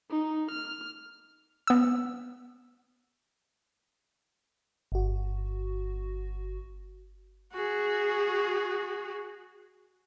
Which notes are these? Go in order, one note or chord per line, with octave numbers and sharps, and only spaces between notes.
D#4
F6
B3 E6
G1 F#4
F#4 G#4